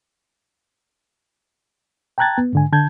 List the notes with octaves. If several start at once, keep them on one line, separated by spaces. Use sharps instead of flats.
G5 A5 A#5 F#6 G#6 A6
B3
G#2 D3 G#5
D3 A5 G6 G#6